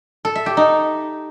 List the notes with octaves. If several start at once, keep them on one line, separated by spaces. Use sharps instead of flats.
A4
E5
G4
D#4